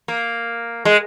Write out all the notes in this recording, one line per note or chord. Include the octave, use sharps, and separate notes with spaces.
A#3
G#3